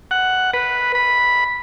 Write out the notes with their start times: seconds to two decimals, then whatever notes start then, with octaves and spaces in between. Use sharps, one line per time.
0.11 F#5
0.54 B4
0.95 B5